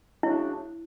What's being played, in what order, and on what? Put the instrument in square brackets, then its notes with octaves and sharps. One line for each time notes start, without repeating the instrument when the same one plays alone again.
[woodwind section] C#3 F#3 A3 D4 [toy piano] E4